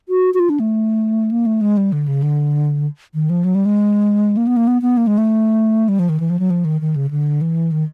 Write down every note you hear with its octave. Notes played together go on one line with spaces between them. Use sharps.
F#4
F#4
F4
D4
A3
A#3
A3
G#3
G3
D3
C#3
D3
D#3
F3
F#3
G3
G#3
A#3
B3
A#3
B3
B3
A#3
G#3
A3
G3
F3
D#3
E3
F3
F#3
F3
D#3
D#3
C#3
D3
E3
D#3